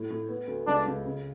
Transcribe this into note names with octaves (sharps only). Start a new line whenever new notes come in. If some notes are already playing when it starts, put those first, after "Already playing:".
Already playing: A2
A2
B3
D2
C#2 D4
C#2
C#3